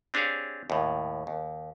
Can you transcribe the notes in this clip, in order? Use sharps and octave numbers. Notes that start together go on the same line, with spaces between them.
C4 D4 G4 G#4 C#5 F5
D#2 A2
D#2